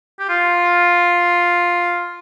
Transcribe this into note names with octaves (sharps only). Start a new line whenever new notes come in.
G4
F4